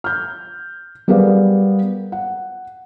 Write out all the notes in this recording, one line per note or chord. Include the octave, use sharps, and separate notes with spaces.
F6 G6
G3 B3 G#4 A#4 D5 F5
F#5